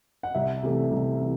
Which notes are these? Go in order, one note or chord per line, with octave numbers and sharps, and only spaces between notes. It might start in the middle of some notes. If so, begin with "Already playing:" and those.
F#5
C2 E5
C3 E3 A3
C2
C3 E3